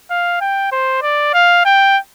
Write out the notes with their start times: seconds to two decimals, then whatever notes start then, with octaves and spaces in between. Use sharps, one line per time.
0.11 F5
0.41 G5
0.72 C5
1.03 D5
1.34 F5
1.66 G5